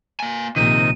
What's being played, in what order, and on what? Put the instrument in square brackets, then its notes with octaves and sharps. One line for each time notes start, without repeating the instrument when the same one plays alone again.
[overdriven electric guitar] A#3 G#5
[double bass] A#1 [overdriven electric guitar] C3 [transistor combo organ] D#3 [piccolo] D#7